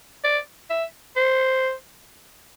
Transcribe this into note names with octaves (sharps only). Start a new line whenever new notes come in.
D5
E5
C5